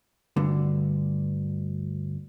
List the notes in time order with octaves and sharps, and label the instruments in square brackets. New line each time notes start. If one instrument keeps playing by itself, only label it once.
[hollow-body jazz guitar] D2 G2 D3